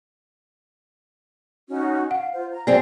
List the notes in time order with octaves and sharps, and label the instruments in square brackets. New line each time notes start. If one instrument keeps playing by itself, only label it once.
[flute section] C#4 D#4 F#4
[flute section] F5 [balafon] F#5
[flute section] F4 C5
A#5
[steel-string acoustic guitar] F#2 C4 G#4 [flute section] C5 [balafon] D5